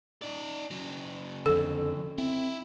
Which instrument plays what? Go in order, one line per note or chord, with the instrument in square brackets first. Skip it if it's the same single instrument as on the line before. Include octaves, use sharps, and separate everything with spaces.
[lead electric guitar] D#4 D5
C#3 F#3
[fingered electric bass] F2 D3 [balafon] A4
[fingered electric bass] C4 [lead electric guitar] E4